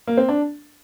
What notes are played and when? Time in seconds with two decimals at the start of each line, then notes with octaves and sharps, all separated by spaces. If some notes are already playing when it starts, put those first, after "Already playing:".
0.07 A#3
0.17 C4
0.29 D4